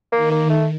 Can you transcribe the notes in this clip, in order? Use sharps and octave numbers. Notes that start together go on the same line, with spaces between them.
D#3 A#3
A#3
A3